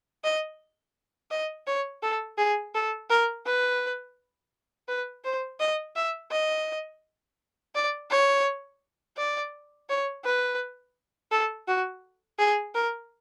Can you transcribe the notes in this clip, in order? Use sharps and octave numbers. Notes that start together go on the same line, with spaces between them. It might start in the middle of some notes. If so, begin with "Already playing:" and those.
D#5
D#5
C#5
A4
G#4
A4
A#4
B4
B4
C5
D#5
E5
D#5
D5
C#5
D5
C#5
B4
A4
F#4
G#4
A#4